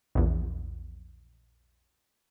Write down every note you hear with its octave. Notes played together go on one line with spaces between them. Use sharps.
A#1 E2